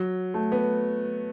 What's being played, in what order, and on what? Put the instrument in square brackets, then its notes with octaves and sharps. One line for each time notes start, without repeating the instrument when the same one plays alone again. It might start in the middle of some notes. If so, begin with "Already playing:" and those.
Already playing: [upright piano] F#3
A3
B3